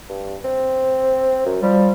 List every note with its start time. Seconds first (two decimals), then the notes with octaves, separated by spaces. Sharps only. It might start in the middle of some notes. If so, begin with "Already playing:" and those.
0.09 G2
0.45 C4
1.46 F#2
1.63 F3 G3